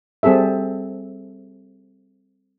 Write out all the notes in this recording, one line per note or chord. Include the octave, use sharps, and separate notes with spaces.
G3 C4 G#4 A4 E5